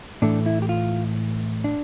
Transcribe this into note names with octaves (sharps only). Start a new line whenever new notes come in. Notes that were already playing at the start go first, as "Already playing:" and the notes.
A2 E3 A3 D4
E4
G4
F4
D4